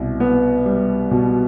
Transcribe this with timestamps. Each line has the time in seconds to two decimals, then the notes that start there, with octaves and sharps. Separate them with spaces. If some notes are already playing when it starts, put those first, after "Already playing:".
Already playing: C2 B2
0.20 B3
0.66 G3
1.11 B2